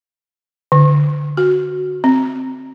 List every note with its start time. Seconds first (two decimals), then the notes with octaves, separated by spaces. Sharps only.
0.72 D3
1.37 F#4
2.04 C4